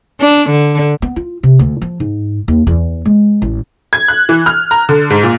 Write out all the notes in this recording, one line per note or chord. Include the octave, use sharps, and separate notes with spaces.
D4
D3
B3
F4
C3
D2
F3
G#2
D#2
E2
G#3
A1
G#6
F#6
E3
F6
A#5
D3
G#2
A#2